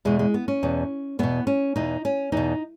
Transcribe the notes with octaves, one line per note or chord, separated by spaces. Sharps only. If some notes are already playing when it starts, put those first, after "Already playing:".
E2 B2 G#3
G#3
B3
C#4
E2 B2
E2 B2 B3
C#4
E2 B2 D#4
C#4
E2 B2 D#4